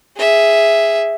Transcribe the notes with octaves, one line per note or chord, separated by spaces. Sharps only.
G#4 E5